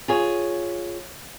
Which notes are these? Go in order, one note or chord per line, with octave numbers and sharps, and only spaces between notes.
F4 G#4 C#5